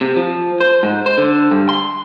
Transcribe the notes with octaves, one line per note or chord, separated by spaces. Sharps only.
C3
F3
C5
G#2
C5
D3
G2
C6